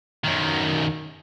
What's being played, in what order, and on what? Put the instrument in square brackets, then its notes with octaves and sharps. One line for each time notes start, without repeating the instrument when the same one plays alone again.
[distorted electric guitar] F#2 D#3